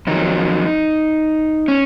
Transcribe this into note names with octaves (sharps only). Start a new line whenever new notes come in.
F2 D#3 F#3 D#4
C#4